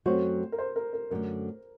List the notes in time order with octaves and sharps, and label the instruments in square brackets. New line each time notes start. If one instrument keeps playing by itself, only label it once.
[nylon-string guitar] F#2 F#3 A3 C4 F#4 [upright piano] C5
[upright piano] A#4
C5
A#4
A#4
[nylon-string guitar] F#2 D3 A3 [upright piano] A#4